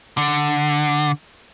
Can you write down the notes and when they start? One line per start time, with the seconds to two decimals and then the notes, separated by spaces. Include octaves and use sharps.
0.18 D3